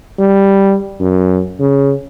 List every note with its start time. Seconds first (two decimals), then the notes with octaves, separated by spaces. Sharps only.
0.19 G3
1.00 F#2
1.60 C#3